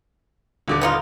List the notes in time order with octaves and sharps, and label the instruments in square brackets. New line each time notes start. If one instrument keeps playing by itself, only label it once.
[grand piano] D#1 D3 D6
[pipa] B3 D#4 F4